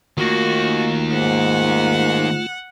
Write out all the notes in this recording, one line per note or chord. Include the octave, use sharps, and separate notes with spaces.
D#3 A3 A#3 F4 F#4
G#2 F#5